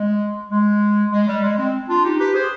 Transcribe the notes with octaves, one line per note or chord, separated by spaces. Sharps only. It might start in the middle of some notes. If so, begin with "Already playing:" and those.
Already playing: G#3
G#3
G#3
G3
G#3
G#3 C4
D4 F4
D#4 G4
G4 B4
G#4 C5